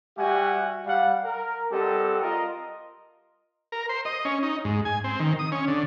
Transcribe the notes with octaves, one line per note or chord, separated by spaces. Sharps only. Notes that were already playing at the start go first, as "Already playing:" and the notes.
G3 F#4 G4 E5 F#5 G#5
G3 F5 F#5
A#4
G3 C4 G4 A4 D#5 F#5
F4 A#4 D#5
A#4
C5
D#5
C#4
D#4
G#2
G#5
C4
D#3
D#6
C#4
D3